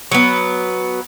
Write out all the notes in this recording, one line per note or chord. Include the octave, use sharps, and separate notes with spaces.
F#3 B3